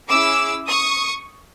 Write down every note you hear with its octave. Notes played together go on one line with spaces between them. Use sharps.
C#4 E4 G#4 D6 E6
C#6 D#6